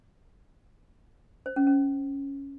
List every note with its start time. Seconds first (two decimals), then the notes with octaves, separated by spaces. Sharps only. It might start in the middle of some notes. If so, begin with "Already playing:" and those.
1.46 C5
1.56 C#4
1.67 C#4